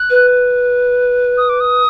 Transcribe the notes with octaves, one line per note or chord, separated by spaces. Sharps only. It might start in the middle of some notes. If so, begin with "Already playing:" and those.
Already playing: F#6
B4
D#6
D6
D#6